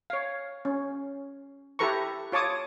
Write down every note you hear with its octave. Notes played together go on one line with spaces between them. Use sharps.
C#5 F5
C#4
E4 G4 A4 B4 A#5 C#6
F4 C#5 A5 D6 D#6